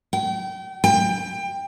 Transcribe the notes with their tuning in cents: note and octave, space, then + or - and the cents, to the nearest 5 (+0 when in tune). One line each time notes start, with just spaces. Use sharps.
G5 -35
G5 +20